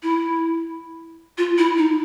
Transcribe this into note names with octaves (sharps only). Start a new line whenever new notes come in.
E4
F4
E4
D#4